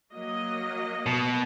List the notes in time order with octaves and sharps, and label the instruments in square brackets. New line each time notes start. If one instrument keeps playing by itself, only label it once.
[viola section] F#3 A#3 D#5
[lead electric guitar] B2